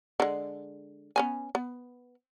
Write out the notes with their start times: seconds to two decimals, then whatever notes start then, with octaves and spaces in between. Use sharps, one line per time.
0.20 D3 G#3
1.16 B3 C#4 G#5
1.55 B3